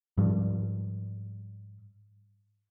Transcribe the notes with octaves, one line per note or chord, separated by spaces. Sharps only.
G#2 F3 G3